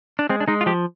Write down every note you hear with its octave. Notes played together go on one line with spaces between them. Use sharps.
D4
G#3 C4
D4
G#3 D#4
F4
F3 G4